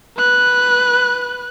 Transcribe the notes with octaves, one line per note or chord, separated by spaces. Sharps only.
B4 F#6